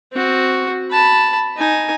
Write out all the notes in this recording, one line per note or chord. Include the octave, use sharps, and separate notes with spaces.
C4 F#4
A5 B5
D#4 G#5